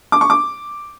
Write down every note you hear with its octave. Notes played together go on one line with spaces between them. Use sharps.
D6
C#6
D6